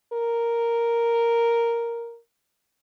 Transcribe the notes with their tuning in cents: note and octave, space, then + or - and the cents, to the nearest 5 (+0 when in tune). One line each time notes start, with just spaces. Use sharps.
A#4 +0